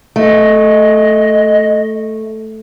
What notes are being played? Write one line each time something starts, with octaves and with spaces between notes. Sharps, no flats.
A3 D#5